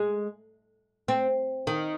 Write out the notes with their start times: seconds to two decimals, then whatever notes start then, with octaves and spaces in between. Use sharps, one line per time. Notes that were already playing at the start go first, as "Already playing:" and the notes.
Already playing: G#3
1.08 C4
1.67 D#3